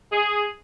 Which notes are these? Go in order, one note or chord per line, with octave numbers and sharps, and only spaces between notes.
G#4